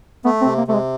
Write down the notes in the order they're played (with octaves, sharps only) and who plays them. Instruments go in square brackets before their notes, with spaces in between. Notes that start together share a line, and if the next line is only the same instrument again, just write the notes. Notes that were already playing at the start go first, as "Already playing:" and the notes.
[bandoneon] A3 [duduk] B3
[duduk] C4
[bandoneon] C3
[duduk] A#3
[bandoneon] C3 [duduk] A3
[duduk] G#3